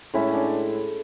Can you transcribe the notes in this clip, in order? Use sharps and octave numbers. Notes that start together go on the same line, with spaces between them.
A2 G#3 C#4 E4
D4